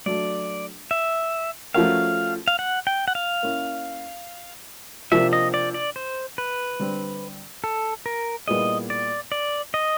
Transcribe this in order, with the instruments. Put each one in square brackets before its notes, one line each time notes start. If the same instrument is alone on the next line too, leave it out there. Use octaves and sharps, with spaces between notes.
[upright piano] F#3 A3 D4 [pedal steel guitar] D5
[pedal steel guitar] E5
[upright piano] F3 A3 C#4 F#4 A#4 [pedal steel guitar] F5
[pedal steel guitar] F5
F#5
G5
F#5
F5
[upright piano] A#3 C#4 E4
[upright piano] C3 F3 A#3 D4 F4 [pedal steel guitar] E5
[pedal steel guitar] D#5
D5
D5
C5
B4
[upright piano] D3 G3 C4
[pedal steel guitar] A4
A#4
[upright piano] A#2 G3 B3 E4 G#4 [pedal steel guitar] D#5
[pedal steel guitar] D5
D5
D#5